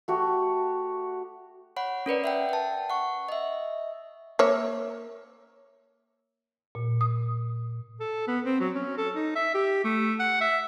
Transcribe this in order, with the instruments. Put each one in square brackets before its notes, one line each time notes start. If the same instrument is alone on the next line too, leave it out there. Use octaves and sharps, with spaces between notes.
[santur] A3 F#4 G4
[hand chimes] C#5 F#5 B5
C#4 A#4 B4 D5
E5 F#5 G5
G5 A5
F#5 C#6
D#5 E5
[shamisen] A#3 C#5 E5
[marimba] A#2
D#6
[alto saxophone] A4
B3
C4
F#3
C#4
A4
D#4
E5
G4
A3
F#5
E5